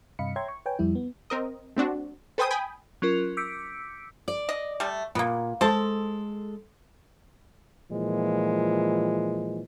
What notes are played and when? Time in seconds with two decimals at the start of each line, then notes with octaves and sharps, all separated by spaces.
0.19 G2 C3 D#5 F5 B5 C#7
0.36 C#5 E5 G5 A#5 C6 G#6
0.48 C#6
0.66 B4 C#5 G5 G#5
0.79 F2 G3 E4
0.95 B3
1.30 C4 A#4 D#5
1.76 A3 C4 D4 F#4
2.38 A4 B4 C5 G5 G#5 D#6
2.51 G5 G#5 B5 D#6
3.02 F#3 C#4 F4 A#4
3.37 D6 E6 G6 B6 C#7 D7
4.28 D5
4.49 D#5
4.80 G3 A3
5.15 A#2 A#3 B3
5.61 G#3 A4 C5 A5
7.91 A#2 E3 F3 G#3